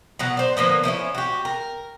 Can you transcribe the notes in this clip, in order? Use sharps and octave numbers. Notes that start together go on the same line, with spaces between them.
B2 F#3 F#5
C5 D5
D3 F3 A#3 B3
F3 A3 C#4 E4
F#4 G4
A#4